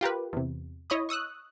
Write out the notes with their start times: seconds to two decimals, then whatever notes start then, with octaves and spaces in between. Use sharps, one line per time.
0.01 F4 G4 A#4 B4
0.33 E2 C3
0.90 E4 C#5 D#5 B5 D#6
1.09 C#6 D#6 E6 F#6